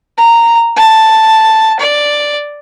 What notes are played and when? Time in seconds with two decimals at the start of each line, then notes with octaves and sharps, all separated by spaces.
0.17 A#5
0.77 A5
1.79 D5